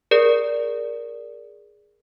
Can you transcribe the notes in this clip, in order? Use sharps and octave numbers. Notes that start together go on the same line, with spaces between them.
G#4 A#4 D5